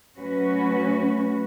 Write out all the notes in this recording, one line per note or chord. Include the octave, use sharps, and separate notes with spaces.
F#3 A3 C#4 F#4 B4